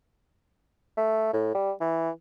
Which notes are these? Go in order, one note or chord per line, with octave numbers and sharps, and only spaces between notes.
A3
A2
G3
E3